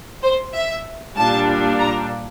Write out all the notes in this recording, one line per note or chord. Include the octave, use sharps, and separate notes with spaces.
C5
E5
A#2 G3 D4 A5
A#5